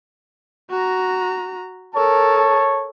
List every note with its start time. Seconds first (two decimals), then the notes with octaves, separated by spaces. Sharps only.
0.70 F#4 A#5
1.95 A4 A#4 C#5 A5